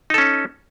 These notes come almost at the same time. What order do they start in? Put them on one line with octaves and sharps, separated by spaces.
D#4 A4 C#4